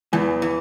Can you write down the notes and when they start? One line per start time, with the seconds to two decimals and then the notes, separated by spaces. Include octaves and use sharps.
0.13 E2 E3
0.42 E3